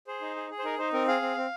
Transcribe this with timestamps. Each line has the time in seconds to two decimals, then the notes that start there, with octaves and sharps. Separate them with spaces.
0.07 G#4 C5
0.22 D#4
0.36 G#4
0.50 G#4
0.59 C5
0.64 D#4 A#4
0.79 D#4 C5
0.93 C4 A#4
1.08 G#4 F5
1.22 C4
1.37 C4